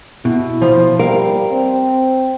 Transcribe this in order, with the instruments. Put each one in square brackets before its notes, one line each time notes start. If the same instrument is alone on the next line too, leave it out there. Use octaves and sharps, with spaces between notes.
[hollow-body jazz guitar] B2 [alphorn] E4
[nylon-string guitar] F3
[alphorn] G3 [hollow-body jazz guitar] A#4 [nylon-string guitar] F5
[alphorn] C4